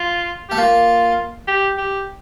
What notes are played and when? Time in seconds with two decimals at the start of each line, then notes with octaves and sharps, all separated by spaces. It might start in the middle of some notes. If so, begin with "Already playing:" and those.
Already playing: F4
0.49 A3 G4
0.58 A#3 F4
1.47 G4
1.78 G4